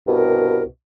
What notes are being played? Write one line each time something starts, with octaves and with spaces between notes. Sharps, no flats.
C2 G2 B2 A#4